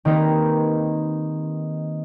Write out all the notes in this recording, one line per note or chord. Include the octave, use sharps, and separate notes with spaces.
D#3 A#3 C4 D#4 G4 B4